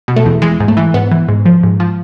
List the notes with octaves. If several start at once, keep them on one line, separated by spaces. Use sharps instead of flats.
B2
A3
E2
E3 G#3
G#2
A3
E3
G#2 B3
E3
G#2
F3
G#2
F3